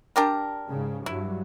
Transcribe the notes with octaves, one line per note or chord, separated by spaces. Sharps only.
D4 G4 A#4
G#2 C#3
G2 F#3 E4